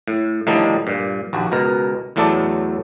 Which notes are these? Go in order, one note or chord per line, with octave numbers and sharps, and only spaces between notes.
A2
A2 D3 D#3 F3 G3 D#4
G2 A#2
A#1 D#2 F#4
C#2 B2 A#4
E2 A2 F#3 A3 A4 D5